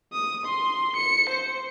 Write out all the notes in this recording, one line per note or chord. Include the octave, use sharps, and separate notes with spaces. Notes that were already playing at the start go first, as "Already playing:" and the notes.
D#6
C6
C#7
C5